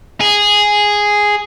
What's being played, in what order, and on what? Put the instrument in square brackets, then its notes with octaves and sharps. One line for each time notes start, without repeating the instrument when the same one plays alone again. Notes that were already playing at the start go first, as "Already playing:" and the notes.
[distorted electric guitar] G#4